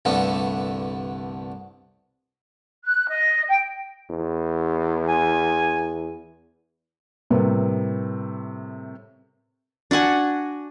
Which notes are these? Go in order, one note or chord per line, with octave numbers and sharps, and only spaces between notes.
C2 G2 D3 A3 B3 A4
F#6
D#5
G5
E2
G#5
A2 C3 G3 A#3 B3
D4 F#4 F#5 G#5